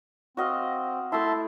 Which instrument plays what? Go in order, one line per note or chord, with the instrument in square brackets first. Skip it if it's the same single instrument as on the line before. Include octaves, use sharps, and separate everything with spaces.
[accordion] C4 [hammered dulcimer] F#4 D#5 F5
[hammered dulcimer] A3 E4 [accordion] E5 A5 C6